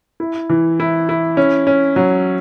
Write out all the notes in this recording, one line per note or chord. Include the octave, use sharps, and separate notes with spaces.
E4
E3
E4
E4
C#4
C#4
F#3